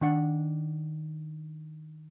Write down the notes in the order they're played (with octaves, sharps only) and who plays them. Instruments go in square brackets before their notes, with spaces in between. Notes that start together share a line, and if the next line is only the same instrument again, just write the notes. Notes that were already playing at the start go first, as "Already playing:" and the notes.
[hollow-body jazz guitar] D#3 D4 F#5